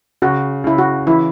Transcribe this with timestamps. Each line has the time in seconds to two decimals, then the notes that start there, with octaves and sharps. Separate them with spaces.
0.22 C#3 F#4
0.64 C#3 E4
0.78 F#4
1.07 E3 E4